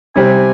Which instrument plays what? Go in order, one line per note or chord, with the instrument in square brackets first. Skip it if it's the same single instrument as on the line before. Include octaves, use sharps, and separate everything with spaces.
[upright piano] C3 G3 C4 G4 [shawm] G#5